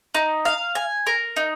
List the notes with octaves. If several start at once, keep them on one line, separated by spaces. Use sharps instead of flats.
D#4
F5
G#5
A#4
D#4